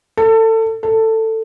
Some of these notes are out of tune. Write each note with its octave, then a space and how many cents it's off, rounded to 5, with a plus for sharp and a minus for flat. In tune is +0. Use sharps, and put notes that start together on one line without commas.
A4 +25
A4 +15